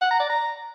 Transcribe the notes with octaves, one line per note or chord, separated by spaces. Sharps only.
F#5
A#5
D5
A#5